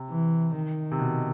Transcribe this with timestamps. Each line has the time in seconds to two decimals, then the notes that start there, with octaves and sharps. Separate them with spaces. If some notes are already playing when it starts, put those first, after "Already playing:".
Already playing: C3
0.10 E3
0.54 D#3
0.92 C3
0.99 B2